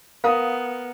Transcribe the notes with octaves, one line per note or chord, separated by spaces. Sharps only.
B3 A#4 F5 D#6